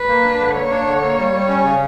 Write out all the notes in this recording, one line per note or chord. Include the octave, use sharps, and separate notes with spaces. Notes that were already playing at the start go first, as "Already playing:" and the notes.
Already playing: B4
A#3
D4
D3
A#3 C#5
D4
D3
A#3
G3
G3
C#4
C#3